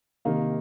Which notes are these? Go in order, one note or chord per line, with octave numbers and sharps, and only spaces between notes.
C3 D#3 A#3 D#4 F5